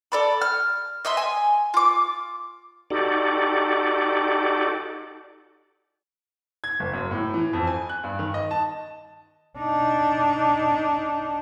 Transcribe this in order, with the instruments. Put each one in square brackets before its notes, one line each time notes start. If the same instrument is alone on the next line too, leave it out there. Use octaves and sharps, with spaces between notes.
[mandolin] A4 D5 B5
F6
D#5 E5 C6
G#5
F4 D6
[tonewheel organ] D#4 F#4 G4 A4 D5
[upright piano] G#6
F#1
F#2
A2
E3
F2
G#5
F#6
G2
D#3
D#5
A5
[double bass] D4 D#4